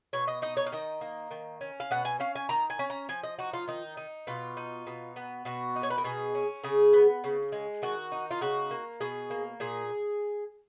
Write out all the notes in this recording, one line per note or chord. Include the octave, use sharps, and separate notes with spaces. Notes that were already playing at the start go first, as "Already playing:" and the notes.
B2 C#5
D#5
D#4 D#5
C#5
F5
D#3 D#5
A#3
D#3
C#4
F5
B2 F#5
G#5
C#4 F5
G#5
D#3 A#5
G#5
C#4
A#5
F3 G#5
D#5
D#4 F#4
F4
D#3 D#4
D#4
B2 F4
D#4
B2
B3
B2 F#4
D#4
C#5
B4
A#4
B2 G#4
C#4
C#3 G#4
B3
C#3
G#3
D#3 F#4
D#4
F4
C#3 F#4
A#3
B2 G#4
A#3
A#2 G#4